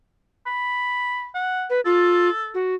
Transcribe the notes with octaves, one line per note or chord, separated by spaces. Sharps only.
B5
F#5
B4
F4 A4
F#4